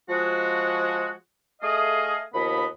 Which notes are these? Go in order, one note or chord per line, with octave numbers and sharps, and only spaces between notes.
F3 G#3 F#4
A3 G#4 D#5 F5
D#2 F3 B3 D#5 B5